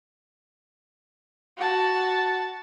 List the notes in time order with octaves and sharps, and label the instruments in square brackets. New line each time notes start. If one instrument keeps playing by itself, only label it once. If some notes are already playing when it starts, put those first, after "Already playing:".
[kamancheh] F#4 A5